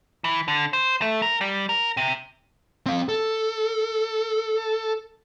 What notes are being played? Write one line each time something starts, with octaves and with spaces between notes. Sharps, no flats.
E3
D3
C5
A3
A#4
G3
A#4
C3
C4 F5
A4